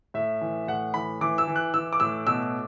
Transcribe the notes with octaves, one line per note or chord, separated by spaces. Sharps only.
A2 E5
E3
A2 F#5
E3 B5
E3 D6
E6
E3
F#6
E3 E6
D6
A2 E6
B2 E6